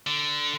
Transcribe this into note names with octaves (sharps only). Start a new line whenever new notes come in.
D3